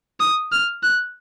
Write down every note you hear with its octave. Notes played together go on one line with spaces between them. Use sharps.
D#6
F6
F#6